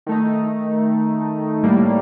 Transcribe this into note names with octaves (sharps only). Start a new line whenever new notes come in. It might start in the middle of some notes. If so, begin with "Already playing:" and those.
D#3 A3 D#4
A2 G3 A#3